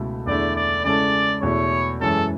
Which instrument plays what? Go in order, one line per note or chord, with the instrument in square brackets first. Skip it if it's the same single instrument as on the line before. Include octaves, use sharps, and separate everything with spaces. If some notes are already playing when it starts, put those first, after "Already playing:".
Already playing: [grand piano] C#2 B2 A3 E4 A4
[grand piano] E2 D3 A3 E4 [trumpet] D5
[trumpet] D5
[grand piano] C#3 G#3 C#4 E4 A4 [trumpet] D5
[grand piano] E2 B2 A3 E4 [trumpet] C#5
[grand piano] F#2 E3 G#3 C#4 [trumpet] A4